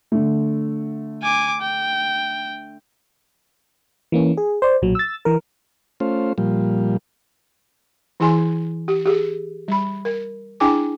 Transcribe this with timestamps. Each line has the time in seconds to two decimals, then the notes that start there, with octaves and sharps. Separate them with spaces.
0.12 D3 A3
1.23 G#5 D6
1.61 G5
4.12 E3 A#3 C#4
4.37 G#4
4.62 C5 D5
4.82 B1 A#2 F#3
4.95 E6 A6
5.25 E3 A#4
6.00 A3 C#4 F4 C5
6.38 A#2 F3 G3
8.20 E3 E4 G#4 G#5 C6
8.88 G4
9.06 G4 G#4
9.68 G3 B5
10.05 A#4
10.60 D4 E4 G#4 G5 G#5 D6